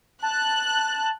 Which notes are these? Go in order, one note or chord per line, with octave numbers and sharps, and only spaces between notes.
A5 F#6